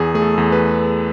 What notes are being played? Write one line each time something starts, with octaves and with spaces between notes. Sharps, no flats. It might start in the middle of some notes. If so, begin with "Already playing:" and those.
Already playing: E2 G#4
A3 G#4
A4
E2
B4